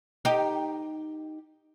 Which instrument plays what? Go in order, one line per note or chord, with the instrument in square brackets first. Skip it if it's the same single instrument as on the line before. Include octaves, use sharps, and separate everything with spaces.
[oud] D#4 G4